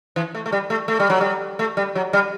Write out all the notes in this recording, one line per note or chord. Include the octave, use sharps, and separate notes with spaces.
E3
A3
A3
G3
A3
A3
G3
F#3
G3
A3
G3
F#3
G3